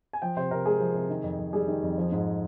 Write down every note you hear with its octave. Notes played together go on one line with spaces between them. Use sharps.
G#5
F3 G5
C3 C5
C3 A#4
G#3 G#4
F3
C3
D#3
F2
F2
G3 G#4
D#3
F2
F3
G#2